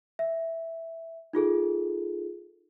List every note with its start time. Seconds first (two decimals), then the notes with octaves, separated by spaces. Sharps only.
0.19 E5
1.33 D#4 F4 G#4 A4